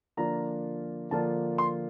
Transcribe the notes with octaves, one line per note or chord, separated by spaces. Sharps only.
D3 F3 A#3 D4 F4 A#5
D3 F3 A#3 D4 F4 A5
C6